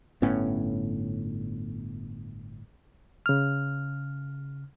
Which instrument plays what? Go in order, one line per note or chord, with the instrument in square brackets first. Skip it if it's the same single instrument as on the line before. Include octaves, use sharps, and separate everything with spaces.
[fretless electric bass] G1 A2 B3 C#4
[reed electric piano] C#3 F6